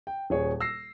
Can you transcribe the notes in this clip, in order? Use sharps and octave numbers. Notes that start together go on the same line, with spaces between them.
G5
D#1 G#4 C#5
E6 A#6 C7